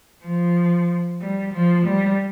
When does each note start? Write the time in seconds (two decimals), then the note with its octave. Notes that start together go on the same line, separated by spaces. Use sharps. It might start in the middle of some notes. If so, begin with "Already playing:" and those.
0.25 F3
1.21 G3
1.52 F3
1.85 G3